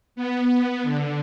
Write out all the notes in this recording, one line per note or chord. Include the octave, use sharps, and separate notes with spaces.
B3
D3